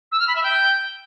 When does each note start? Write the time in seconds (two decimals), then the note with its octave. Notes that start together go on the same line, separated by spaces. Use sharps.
0.12 E6
0.20 F6
0.28 B5
0.35 E5
0.43 G5